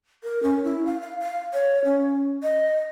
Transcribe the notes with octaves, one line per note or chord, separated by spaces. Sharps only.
A#4
C#4
E4
F5
F5
F5
C#5
C#4
D#5